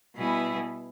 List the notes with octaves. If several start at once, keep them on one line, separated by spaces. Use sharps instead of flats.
B2 G3 B3 E4 G#4